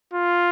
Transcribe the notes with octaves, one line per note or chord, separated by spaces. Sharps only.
F4